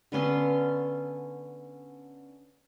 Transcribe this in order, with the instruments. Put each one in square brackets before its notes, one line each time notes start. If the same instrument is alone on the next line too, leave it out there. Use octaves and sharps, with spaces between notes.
[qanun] D3 B3 C#4 C6